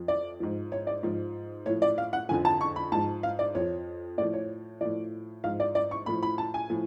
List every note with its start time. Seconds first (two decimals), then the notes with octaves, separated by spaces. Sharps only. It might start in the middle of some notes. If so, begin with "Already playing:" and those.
Already playing: F2 F3
0.08 D5
0.40 G#2 F3
0.72 C#5
0.87 D5
1.03 G#2 F3
1.66 A2 F3 C#5
1.82 D5
1.98 F5
2.13 F#5
2.29 F2 D3 F3 G#5
2.45 A5
2.61 C#6
2.76 B5
2.92 G#2 F3 A5
3.23 F5
3.39 D5
3.55 F2 F3 C#5
4.18 A2 D5
4.22 F3
4.33 C#5
4.81 A2 F3 D5
5.44 G#2 F3 F5
5.60 D5
5.75 D5
5.91 C#6
6.06 A2 F3 B5
6.23 B5
6.38 A5
6.54 G#5
6.70 A2 F3